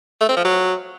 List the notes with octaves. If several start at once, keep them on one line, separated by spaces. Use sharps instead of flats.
A3
C4
F3
F#3